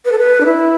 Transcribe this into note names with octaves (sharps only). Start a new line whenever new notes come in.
B4
A4
B4
D4
E4